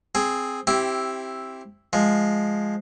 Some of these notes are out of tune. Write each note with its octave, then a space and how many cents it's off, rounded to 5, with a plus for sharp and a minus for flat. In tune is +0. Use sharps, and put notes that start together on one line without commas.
C4 +0 G#4 +0
C4 +10 E4 +0 G4 -10
F3 +0 G#3 +0